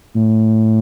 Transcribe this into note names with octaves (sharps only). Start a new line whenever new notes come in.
A2